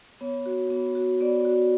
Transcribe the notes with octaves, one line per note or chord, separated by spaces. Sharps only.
B3 C#5
F#4
B3
F#4
B3 D5
F#4